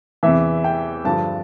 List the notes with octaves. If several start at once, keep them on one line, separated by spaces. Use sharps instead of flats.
E2 C3 E3 E5
G5
G2 D3 F3 A5